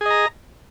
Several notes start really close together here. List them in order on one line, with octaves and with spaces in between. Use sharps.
G#4 D#5 A#5